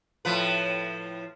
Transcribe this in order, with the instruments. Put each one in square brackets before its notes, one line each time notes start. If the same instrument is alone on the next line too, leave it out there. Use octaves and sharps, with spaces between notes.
[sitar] A2 F3 B4